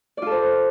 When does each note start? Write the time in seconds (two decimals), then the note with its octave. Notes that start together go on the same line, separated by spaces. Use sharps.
0.17 D5
0.22 F4
0.27 A4
0.31 C5